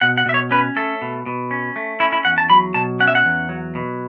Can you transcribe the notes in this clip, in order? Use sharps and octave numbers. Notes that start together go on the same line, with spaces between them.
B2 F#5
F#5
B2 E5
C#5
C#4 B4
A3 A4
B2
B2
C#4
A3
C#4 E4
E4
E2 F#5
A5
F#3 B5
B2 A5
C#4 F#5
E5
F#5
E2
F#3
B2